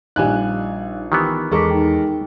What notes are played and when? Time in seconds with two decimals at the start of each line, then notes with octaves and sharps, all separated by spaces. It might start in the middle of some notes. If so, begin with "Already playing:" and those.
0.16 A#1 G3 D#4 F5 G#5 F#6
1.12 D#3 E3 B3 G4
1.52 E2 G#3 A4 A#4 C#6 D6 B6
1.70 D#4 G5